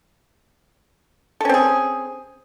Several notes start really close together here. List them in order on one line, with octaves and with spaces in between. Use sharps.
A4 C#4 C4 G#4